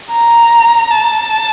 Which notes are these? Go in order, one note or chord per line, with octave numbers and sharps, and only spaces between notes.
A#5
A5